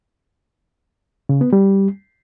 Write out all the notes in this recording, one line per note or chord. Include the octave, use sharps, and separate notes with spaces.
C#3
B3
G3